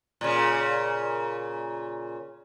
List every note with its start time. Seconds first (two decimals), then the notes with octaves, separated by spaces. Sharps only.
0.21 A#2 C#3